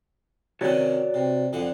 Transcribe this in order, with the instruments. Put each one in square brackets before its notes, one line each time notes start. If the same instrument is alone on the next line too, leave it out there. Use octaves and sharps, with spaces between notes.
[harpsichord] C3 D#3 C#4 [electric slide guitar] F#4 C#5 D5
[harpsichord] C3
F2 D3 F#5